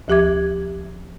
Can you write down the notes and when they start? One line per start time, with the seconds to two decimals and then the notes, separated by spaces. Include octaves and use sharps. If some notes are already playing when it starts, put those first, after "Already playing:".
0.08 D2 F3 G4 E5 D6 G#6